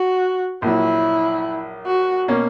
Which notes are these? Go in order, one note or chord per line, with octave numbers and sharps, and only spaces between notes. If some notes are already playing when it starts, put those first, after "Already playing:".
Already playing: F#4
A#1 A#2 F#3 E4
F#4
B2 A#3 C#4